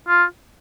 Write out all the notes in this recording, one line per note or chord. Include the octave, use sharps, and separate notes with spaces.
F4